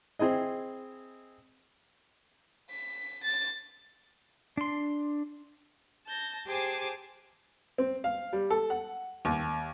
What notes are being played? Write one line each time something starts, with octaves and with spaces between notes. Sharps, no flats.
C4 E4 G#4 D#5
B6
A6
D4 C6
A5 G6 A#6
G4 G#4 C5 G#5 A5 D6
C4
F5
G3
A4
F#5
D#2